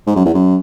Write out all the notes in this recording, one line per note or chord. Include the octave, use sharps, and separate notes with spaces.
G#2
F#2
E2
F#2